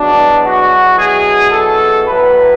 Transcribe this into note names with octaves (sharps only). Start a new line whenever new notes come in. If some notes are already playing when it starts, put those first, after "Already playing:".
Already playing: E2 B2 F#3 D4
F#4
G#4
A4
A2 F#3 B4